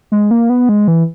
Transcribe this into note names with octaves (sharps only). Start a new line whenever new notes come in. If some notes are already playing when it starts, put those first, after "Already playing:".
G#3
A#3
B3
G#3
E3